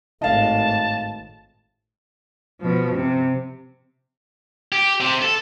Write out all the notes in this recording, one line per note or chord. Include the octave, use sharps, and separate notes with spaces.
G#1 A2 D#5 F5 A5
B2 F3
C3
G4
C3
A4